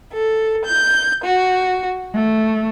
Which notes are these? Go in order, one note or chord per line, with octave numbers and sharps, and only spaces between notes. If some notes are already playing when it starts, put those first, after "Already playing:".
A4
G6
F#4
A3